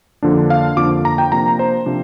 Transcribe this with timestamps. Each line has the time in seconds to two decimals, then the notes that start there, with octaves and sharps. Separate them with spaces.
0.23 F2 D3 F3 A#3 D4
0.50 F5
0.77 F2 D3 F3 A#3 D4 D6
1.05 A#5
1.18 G5
1.32 C3 F3 A#3 D4 A#5
1.59 C5
1.86 C3 F3 A#3 D4